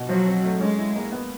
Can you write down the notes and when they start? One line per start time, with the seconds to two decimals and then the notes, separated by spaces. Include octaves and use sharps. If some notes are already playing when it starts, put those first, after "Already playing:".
Already playing: B2
0.08 F3 F#3
0.26 C4
0.44 A3
0.61 G#3 C#4
0.78 E4
0.95 A#3
1.12 B3